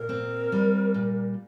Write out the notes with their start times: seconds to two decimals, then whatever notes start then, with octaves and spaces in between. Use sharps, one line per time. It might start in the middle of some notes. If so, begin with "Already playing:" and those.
Already playing: A#2 A#4
0.09 C4
0.52 G3
0.94 A#2